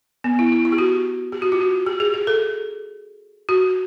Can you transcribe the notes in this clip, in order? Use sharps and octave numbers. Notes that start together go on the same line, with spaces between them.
B3
E4
E4
E4
G4
F#4
G4
F#4
F4
F#4
G4
G#4
G#4
A4
F#4